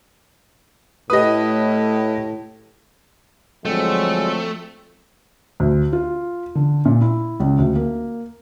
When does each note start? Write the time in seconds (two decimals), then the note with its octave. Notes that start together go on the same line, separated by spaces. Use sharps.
1.10 A2 G4 B4 D#5 D#6
3.65 D2 F3 F#3 G#3 A3 C4
5.60 D2
5.93 F4
6.55 D3
6.85 A#2
7.01 E4
7.40 C#2
7.59 D2
7.76 A#3